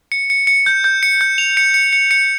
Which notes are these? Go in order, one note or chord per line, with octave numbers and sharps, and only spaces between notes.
C#7
C#7
C#7
G6
G6
C#7
G6
F7
C#7
C#7
C#7
C#7